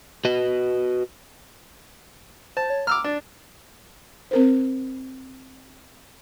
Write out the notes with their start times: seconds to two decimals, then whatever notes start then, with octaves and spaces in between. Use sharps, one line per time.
0.25 F#4 B4 D#5
2.57 C5 A5
2.70 C#5
2.87 A#5 D6 E6 F6
3.04 D4 A6
4.31 C4 A#4 C5